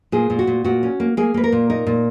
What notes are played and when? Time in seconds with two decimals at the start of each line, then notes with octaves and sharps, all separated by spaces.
0.12 A#2 G#4
0.30 A#2
0.39 F#4
0.47 A#2
0.64 A#2 F#4
0.83 C#4
1.00 A#3
1.17 A#3 G#4
1.34 A#3 B4
1.44 A#4
1.52 A#2
1.70 D#4 A#4
1.87 A#2